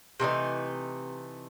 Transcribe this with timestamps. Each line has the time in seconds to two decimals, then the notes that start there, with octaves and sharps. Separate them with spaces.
0.20 C3 E3 A3 D#4